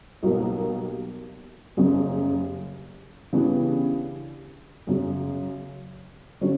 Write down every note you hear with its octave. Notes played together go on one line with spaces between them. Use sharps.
B1 B2 G3 A#3
F#1 F#2 C#3 G3
C#3 E3 B3 D4 G4
F#2 C#3 F#3
D3 F#3 C#4